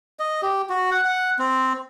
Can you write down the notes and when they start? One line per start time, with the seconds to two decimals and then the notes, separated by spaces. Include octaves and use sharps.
0.19 D#5
0.42 G4
0.69 F#4
0.91 F#5
1.04 F#5
1.39 C4